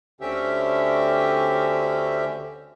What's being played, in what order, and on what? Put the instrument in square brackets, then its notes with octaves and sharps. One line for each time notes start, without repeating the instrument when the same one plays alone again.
[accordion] D2 D3 C4 C#4 G4 E5